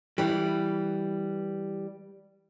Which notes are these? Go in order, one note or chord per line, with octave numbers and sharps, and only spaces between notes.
E3 G3